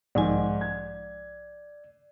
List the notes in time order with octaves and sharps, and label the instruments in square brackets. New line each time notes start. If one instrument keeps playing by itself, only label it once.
[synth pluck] B1 F3 G#5 [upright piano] G#2 D#3 [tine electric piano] D5
[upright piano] G#6